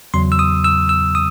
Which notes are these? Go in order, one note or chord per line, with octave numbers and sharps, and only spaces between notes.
E2 C#3 F#3 B3 C6
E6
D#6
E6
E6
D#6